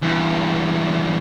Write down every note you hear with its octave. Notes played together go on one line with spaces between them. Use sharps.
E2 G2